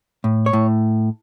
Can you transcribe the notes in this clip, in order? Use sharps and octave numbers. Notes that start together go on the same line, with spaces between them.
A2
C#5
A2